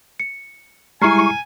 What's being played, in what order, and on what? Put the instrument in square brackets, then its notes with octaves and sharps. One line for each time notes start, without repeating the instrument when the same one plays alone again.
[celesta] C#7
[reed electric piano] G3 G#3 E4 [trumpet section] G#5 [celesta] A#5 F6 C7 [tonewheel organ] C#6